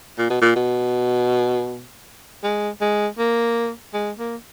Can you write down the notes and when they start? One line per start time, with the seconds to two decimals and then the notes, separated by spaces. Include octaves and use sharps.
0.18 A#2
0.30 B2
0.41 A#2
0.56 B2
2.43 G#3
2.81 G#3
3.18 A#3
3.93 G#3
4.18 A#3